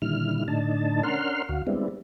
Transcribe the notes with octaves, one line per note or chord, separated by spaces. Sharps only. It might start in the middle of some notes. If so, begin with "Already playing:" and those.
A#2 D3 D#3 G3 E4 F6
A2 D3 D4 D#4 A5
C#4 D4 A#4 F#5 C6 F6
D2 F#4 F5
G3 G#3 B3 C4 D4 E4